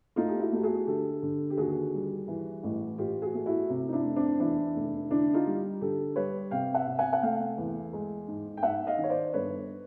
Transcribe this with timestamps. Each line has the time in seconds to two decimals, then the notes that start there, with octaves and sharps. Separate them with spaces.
0.16 A3 D#4 F4
0.28 G4
0.40 E4 F#4
0.52 A3 G4
0.63 F#4 G#4
0.87 D3 G4 A4
1.23 D3
1.50 G4
1.57 D#2 F#4 G#4
1.94 G3
2.28 E3
2.63 A1
2.98 A1 F4 G4
3.22 F#4 G#4
3.34 A3
3.46 E4 F#4
3.69 C3
3.89 D#4
3.93 D4 E4
4.04 F1
4.16 C4 D4
4.40 E2 D4 E4
4.76 F1
5.10 D3 D4 E4
5.34 D#4 F4
5.46 G3
5.81 D3 G4 A4
6.16 G3 B4 C#5
6.51 C3 F5 G5
6.75 E5 F#5
6.87 C3
6.99 F#5 G#5
7.13 F#5
7.22 A3 F5 G5
7.58 E2
7.93 G#3
8.28 G#2
8.57 G5
8.63 G#2 E5 F#5
8.87 D#5 F5
8.98 D#3
9.04 C#5
9.10 C5 D5
9.34 G1 B4 C#5